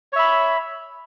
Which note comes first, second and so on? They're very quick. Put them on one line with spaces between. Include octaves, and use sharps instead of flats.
C#5 E5 B5